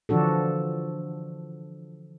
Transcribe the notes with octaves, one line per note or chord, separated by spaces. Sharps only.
D3 E3 F3 D4 F#4 A4